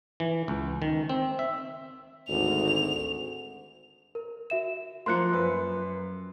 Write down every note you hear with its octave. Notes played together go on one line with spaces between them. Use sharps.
E3
C#2
D#3
C4
E5
G#1 D2 F7
A#4
F#4 E5 E7
F3 A#3 C6 F#6 C#7
F#2 B4